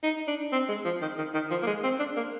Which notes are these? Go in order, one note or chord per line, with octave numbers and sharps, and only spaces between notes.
D#4
D4
C4
G#3
F3
D#3
D#3
D#3
F3
A#3
G#3
C4
D4
A#3